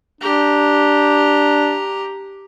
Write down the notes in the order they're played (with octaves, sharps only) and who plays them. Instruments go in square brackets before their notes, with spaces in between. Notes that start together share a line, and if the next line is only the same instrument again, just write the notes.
[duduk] D4 [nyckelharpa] G4 A#5